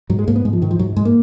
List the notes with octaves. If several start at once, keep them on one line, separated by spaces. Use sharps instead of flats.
G#2 F#3
G#3
G#2 A#3
B3
G#2 G#3
F3
G#2 D#3
F3
G#2 F#3
G#2 G#3
A#3